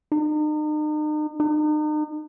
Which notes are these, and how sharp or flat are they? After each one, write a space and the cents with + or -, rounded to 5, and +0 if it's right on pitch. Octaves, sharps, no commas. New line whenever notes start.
D#4 -40
D#4 -40